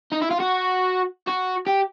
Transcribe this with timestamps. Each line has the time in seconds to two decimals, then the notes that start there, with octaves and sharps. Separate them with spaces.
0.12 D#4
0.21 E4
0.31 F4
0.40 F#4
1.27 F#4
1.67 G4